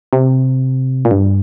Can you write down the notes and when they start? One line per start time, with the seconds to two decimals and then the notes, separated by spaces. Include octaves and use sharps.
0.13 C3
1.05 A#2
1.11 G2